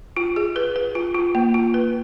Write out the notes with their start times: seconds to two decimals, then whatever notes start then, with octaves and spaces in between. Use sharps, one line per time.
0.17 F4
0.36 G#4
0.56 B4
0.76 B4
0.95 F4
1.15 F4
1.35 A#3
1.54 F4
1.74 B4